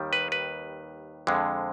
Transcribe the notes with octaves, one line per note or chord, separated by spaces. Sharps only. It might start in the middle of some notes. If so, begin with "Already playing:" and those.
Already playing: D#2 D#3 G3
B4
B4
F2 D3 G#3